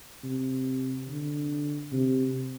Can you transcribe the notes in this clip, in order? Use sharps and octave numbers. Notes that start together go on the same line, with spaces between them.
C3
D3
C3